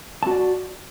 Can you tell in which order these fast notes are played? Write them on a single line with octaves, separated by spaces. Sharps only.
A5 F#4 D5